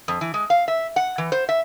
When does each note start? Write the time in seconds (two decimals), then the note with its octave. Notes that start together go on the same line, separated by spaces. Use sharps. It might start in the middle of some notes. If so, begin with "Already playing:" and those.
0.08 F2
0.21 E3
0.34 G#3
0.50 F5
0.68 E5
0.96 F#5
1.18 E3
1.32 C5
1.49 E5